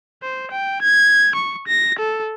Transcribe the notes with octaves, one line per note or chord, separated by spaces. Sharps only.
C5
G5
G#6
C#6
A#6
A4